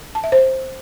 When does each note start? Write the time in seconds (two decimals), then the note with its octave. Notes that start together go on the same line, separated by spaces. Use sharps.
0.15 A5
0.24 E5
0.32 C5